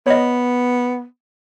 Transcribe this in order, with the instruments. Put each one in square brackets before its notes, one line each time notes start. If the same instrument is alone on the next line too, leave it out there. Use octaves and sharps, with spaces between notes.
[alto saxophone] B3 [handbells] C#5 D#5